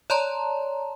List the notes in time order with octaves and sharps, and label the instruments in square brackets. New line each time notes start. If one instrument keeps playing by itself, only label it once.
[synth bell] C#5 D5 A5 A#5 C6